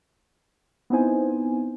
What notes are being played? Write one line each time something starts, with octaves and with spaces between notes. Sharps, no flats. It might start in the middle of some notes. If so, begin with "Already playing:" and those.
B3 C4 D#4 E4 C5 G#5